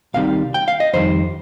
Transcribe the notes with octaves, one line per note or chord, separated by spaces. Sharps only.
C2 C3 D#3 G3 F5
G5
F5
D#5
F2 D#3 G3 C5